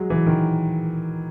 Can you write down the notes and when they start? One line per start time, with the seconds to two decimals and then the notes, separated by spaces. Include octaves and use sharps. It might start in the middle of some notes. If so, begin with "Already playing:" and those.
Already playing: F#3 G#3
0.10 E3
0.26 D#3